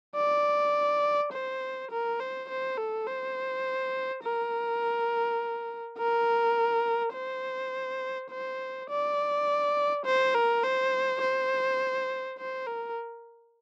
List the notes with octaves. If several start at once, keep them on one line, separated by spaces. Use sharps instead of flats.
D5
C5
A#4
C5
C5
A4
C5
A#4
A#4
C5
C5
D5
C5
A#4
C5
C5
C5
A#4